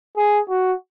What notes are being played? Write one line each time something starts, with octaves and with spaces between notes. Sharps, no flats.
G#4
F#4